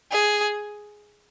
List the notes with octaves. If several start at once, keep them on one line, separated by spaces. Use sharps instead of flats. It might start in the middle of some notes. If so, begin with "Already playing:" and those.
G#4